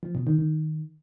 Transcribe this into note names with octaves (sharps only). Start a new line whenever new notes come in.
F3
B2
D#3
D#3